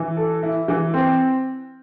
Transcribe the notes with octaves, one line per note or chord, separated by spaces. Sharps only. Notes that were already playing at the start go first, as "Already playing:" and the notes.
Already playing: E3
A4
E4
E3
C4